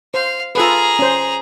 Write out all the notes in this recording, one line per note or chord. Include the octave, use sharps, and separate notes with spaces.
C5 F5
F4 G#4 A4 B4 A#5
C#4 C5